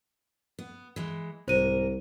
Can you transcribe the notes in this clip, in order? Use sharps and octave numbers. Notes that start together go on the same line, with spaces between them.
B3
E3 G#3
C2 G#2 A#4 C5 D#7